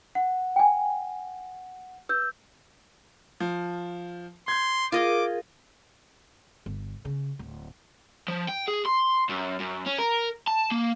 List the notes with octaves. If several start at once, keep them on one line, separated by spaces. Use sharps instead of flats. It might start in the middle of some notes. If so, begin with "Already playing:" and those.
F#5
G5 G#5
B4 E6 G6
F3
C6 G6 G#6
F4 G#4 A#4 D#5 D6
G1
C#3
D1
F3
G5
G#4
C6
F#2
F#2
C#4
A#4
A5
A#3